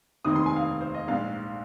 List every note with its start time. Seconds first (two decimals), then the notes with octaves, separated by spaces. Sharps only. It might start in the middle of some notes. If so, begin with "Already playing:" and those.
0.25 F1 D#2 D#3 C4 D#4 D#6
0.36 C6
0.46 G#5
0.56 F5
0.81 C5
0.94 D#5
1.07 A#1 G#2 G#3 F5